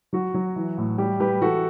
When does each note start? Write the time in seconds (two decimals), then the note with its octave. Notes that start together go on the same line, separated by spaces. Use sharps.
0.13 F#3 F#4
0.34 F#3
0.56 E3
0.78 A2
0.98 G3 G4
1.20 G3 G4 B4
1.41 E3 F#4 A4